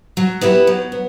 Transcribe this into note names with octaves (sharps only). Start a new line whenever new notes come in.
F#3
B3 E4 G4 B4
F#3
B3